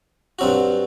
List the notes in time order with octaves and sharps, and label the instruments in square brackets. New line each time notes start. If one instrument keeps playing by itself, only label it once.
[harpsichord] G2 F#3 C4 F#4